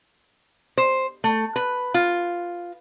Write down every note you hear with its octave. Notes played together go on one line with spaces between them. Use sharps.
C5
A3
B4
F4